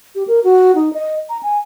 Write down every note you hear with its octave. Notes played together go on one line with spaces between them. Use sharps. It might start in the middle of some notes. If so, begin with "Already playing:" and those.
G4
A#4
F#4
D#4
D#5
A#5
G#5